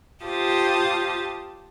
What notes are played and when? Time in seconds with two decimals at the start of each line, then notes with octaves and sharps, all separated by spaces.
0.23 F4 G4 C5 A5 D#6